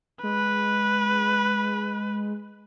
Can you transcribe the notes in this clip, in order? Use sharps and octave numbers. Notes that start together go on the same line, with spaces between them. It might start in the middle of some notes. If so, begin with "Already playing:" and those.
G#3 B4